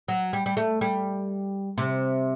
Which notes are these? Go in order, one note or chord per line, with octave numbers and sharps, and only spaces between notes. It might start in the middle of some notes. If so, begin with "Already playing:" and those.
F#3
G3
G3
A3
G3
C3